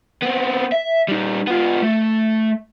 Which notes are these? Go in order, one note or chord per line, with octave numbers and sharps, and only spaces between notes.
B3 C4
E5
G3 D#4
B3 F4
A3